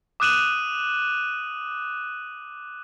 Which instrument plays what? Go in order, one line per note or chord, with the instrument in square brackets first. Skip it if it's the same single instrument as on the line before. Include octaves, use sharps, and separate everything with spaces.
[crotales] D6 D#6 F#6 D#7 E7 F#7